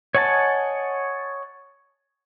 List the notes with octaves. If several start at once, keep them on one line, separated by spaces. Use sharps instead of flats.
C#5 D#5 F#5 G#5 A5